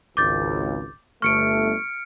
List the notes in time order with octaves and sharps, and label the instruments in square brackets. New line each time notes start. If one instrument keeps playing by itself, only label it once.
[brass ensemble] G#1 C#2 [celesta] D6 G6 A6
[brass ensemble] G1 A3 [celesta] C#6 [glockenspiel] F6 C#7 D7